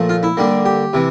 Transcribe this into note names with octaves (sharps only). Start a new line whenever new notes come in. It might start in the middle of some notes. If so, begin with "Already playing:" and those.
Already playing: A#2 F3 A3
F4
E4
D3 G3 A#3
G4
C3 E3